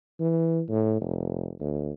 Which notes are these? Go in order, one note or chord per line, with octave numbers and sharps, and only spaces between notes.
E3
A2
F1
D2